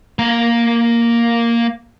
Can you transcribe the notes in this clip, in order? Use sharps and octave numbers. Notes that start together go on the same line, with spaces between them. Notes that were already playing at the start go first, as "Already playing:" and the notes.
A#3 A#5